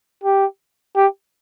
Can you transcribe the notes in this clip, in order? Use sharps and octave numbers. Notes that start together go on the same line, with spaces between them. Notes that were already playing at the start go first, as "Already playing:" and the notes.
G4
G4